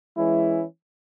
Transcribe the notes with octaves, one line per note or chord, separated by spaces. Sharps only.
E3 G#3 C#4 E4